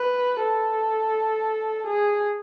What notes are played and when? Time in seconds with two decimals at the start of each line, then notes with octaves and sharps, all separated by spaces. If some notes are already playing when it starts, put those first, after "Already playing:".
Already playing: B4
0.44 A4
1.86 G#4